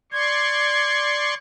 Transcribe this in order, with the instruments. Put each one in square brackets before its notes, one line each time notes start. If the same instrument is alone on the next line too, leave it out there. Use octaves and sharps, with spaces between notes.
[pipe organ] D5 C6 C#6 [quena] G#6